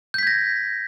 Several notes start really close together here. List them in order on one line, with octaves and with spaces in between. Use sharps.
G6 B6 G#6 A#6